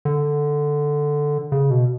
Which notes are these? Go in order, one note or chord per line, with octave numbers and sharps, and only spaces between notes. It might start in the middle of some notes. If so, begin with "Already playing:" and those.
D3
C#3
B2